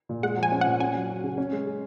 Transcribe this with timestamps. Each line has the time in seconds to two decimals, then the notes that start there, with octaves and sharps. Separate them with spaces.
0.09 A#2
0.23 G#3 F#5
0.37 F3
0.43 G#5
0.52 C#4
0.61 A#2 F#5
0.80 C#4 G#5
0.94 F#3
1.10 F#4
1.24 C#3
1.38 C#4
1.52 G#3
1.67 G#4